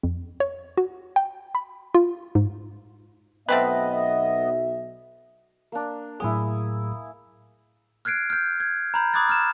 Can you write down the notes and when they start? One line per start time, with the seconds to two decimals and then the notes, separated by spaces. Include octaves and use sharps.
0.03 F2
0.40 C#5
0.77 F#4
1.16 G5
1.55 B5
1.94 F4
2.35 G#2
3.49 B1 F#3 A3 B3 C4 B4 D#5 E5
5.72 A#3 D4
6.20 A2 F#3 E4 G#4 G#5 D#6
8.05 F6 F#6 G#6 C7 D7
8.30 F6 G6
8.60 G#6
8.94 A#5 B5 G6
9.14 B5 D6 D#6 F#6 G#6 A6
9.29 F6 E7